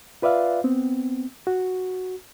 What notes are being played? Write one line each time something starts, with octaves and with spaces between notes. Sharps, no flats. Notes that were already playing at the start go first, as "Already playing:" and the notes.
F4 B4 D5 E5 F5
B3 C4
F#4